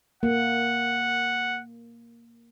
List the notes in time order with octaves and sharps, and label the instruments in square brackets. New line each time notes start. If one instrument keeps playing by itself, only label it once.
[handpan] A#3 [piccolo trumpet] F#5